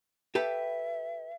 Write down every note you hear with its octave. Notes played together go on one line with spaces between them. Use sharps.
G4 A4 B4 E5